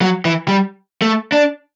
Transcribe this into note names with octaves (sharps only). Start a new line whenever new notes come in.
F#3
E3
G3
A3
D4